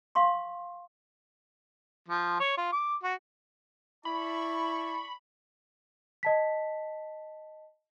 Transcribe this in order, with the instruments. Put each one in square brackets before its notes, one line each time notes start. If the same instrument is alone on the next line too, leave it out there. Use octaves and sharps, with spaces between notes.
[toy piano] F5 C6 C#6
[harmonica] F3
C#5
F4
D6
F#4
[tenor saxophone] E4 [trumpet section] D5 A5 C#6 [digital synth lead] B5
[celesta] D#5 A5 B6